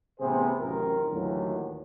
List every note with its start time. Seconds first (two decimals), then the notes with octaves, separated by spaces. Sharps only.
0.20 A1 C3 B3 G#4 C5
0.60 A1 F#2 C3 D#3 F4 A#4
1.12 D#2 A2 D3 E3 F#3